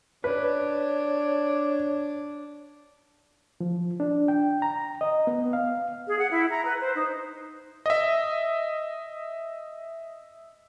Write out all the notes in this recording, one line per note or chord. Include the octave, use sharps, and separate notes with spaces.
D4 B4 C#5
F3
D4
G5
A#5
D#5
B3
F5
G#4
F#5
E4
A#5
B4
C5
D#4
D#5 E5